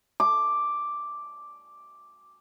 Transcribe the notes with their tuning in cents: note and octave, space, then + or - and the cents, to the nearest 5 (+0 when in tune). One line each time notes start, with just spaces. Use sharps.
D6 +0